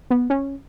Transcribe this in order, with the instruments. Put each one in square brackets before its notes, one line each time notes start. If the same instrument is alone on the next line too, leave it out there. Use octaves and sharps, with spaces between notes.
[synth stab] B3
C#4